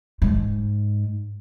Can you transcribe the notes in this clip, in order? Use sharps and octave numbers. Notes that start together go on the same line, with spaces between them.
G#2